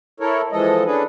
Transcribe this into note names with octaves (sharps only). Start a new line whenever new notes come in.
E4 A4 A#4 C#5
E3 F3 G#3 A4 D#5
C#4 D4 G#4 A4 B4